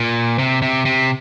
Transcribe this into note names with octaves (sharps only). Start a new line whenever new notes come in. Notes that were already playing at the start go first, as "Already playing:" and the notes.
Already playing: A#2
C3
C3
C3